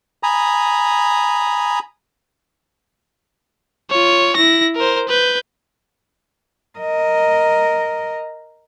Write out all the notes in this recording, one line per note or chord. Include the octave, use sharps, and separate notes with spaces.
G#5 A#5 B5 D#6
F4 C#5
E4 A#6
A#4 C5
B4 G6
A#4 D#5